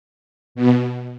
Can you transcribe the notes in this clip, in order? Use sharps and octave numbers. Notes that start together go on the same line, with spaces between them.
B2